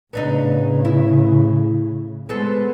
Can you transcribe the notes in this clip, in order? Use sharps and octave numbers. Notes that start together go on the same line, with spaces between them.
A2 C#3 B3 D4 D#4
E4
G#3 B3 A4 C5